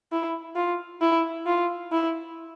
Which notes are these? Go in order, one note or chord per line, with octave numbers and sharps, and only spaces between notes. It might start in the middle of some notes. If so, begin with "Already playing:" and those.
E4
F4
E4
F4
E4